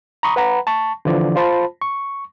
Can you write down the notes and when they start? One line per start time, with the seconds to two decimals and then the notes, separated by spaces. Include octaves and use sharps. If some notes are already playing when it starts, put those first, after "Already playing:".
0.23 A#5 B5 C#6 D#6
0.36 B4 F#5 A#5 B5
0.67 A5 C#6
1.05 D3 E3 F3 D5
1.36 F4 C5 A5 B5
1.82 C#6